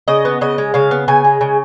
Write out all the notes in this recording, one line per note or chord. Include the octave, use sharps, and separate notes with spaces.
C#3 D#5
B3
C#3 D#5
G#3
C#3 F5
B3
C#3 G#5
G#3
C#3